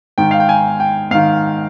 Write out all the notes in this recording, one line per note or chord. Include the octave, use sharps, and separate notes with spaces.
G#2 D#3 G5
F5
G5
G#5
G5
G#2 D#3 F5